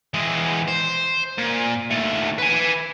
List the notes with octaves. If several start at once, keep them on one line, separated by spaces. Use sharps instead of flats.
E3 G#3
C5
A#2
D#2 A3
B4 G#5